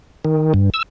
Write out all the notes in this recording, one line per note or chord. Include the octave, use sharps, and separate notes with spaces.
D#3
G2
E6